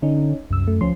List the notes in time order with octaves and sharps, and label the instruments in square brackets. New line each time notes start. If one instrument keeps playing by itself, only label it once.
[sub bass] D3 [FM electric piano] C#4 D#4
[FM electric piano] C2 E6 [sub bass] F#2
[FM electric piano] A3
[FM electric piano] D2 C#4 C6 [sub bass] F3